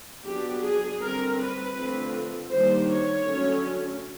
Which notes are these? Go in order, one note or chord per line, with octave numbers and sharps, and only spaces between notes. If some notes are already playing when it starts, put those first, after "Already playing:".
F#3 B3 D4 G4
G#4
D3 G3 C4 A#4
B4
D3 F3 A3 C4
D#3 G3 A#3 D4 C5
C#5
D3 F#3 A3 C#4